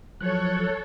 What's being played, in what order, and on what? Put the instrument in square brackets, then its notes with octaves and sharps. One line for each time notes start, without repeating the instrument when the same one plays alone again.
[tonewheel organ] F3 F#3 F#6 [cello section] A4 C#5